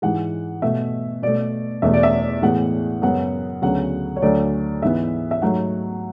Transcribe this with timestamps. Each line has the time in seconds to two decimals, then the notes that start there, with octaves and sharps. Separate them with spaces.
0.02 G#2 E3 G#3 F#5
0.62 B2 A3 E5
1.23 B2 A3 D5
1.82 E2 B2 A3 E5
1.94 D5
2.03 E5
2.42 A2 E3 G#3 B3 F#5
3.02 F#2 C#3 G#3 B3 F#5
3.62 D2 C#3 F#3 B3 F#5
4.16 C#5
4.22 D2 D3 F#3 A3 D5
4.82 G#2 E3 B3 E5
5.31 E5
5.42 G#2 F#3 A3 F#5